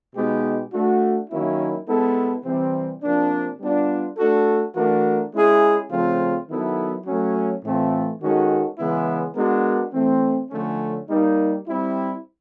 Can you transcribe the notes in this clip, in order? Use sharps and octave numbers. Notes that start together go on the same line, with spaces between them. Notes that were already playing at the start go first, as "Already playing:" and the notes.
B2 G#3 B3 D#4 G4
A3 D4 F#4
D#3 F#3 A#3 C#4 E4
G#3 B3 E4 A4
C3 E3 G3 C4
C3 F3 A#3 D4
G3 B3 D4 F4
A3 D4 F#4 A4
E3 A3 D4 F#4 A#4
G#3 C#4 E4 G#4
C#3 F3 A3 C4 F4
D#3 F#3 B3 E4 A4
F#3 A3 C#4
A2 E3 A3 C4 F4
D#3 G#3 C#4 F#4 A4
C#3 E3 G#3 B3 E4
G#3 B3 D4 F#4 A#4
E3 A3 C4
D3 F3 A3 C#4
G3 A#3 D#4
G3 C4 E4